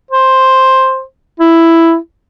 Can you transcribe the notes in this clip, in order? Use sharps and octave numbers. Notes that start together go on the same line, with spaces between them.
C5
E4